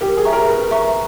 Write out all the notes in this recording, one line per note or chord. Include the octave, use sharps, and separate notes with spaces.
G4 A#4
G#4
E5 A#5 C#6
A#4
A#4 B4
E5 A#5 C#6